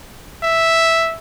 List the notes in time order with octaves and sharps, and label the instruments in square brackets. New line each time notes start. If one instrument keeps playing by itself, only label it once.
[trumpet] E5